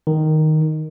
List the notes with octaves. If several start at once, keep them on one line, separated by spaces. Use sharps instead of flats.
D#3